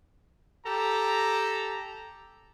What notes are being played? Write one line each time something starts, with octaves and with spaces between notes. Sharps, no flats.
G4 A4 A#5